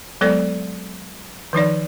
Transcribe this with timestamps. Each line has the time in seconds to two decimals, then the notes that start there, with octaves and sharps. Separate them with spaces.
0.21 F#3 G#3 B3 A4 C5 D5
1.53 D#3 F3 D#4 D5